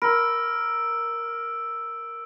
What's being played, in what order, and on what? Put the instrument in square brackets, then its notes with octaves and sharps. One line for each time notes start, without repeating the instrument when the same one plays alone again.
[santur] A#4 [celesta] B5 [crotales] E6 D7